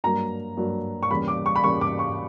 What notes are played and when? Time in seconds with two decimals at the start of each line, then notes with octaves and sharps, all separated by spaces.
0.04 G2 F#3 A#3 A#5
0.57 G2 F#3 A#3
1.03 C#6
1.11 E2 C#3 G3 A#3 B5
1.28 D6
1.46 C#6
1.56 B5
1.64 E2 C#3 G3 A#3 C#6
1.81 D6
1.99 C#6